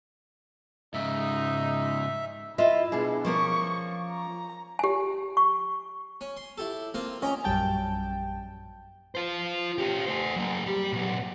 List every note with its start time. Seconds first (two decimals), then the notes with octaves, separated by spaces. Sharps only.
0.94 G#2 C#3 D#4 E5
2.58 E4 F4 D#5 E5
2.92 B2 D4 G#4
3.25 F3 A#3 C#4 C#6
4.11 A#5
4.79 G4 G#5
5.37 C#6
6.21 C#4
6.37 C6
6.58 E4 G4 A4
6.94 A#3 C4 F4
7.22 C#4 D#5 G5 A#5
7.44 A#1 F#2 G3 G5 A5
9.15 F4 C5
9.78 C#4 G4
10.06 A3 C5
10.36 F#3 A#3
10.66 G3 G4
10.93 A#2 F#3